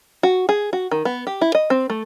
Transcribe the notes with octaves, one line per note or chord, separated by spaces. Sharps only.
F#4
G#4
F#4
D#3
B3
G4
E4
D#5
C4
A3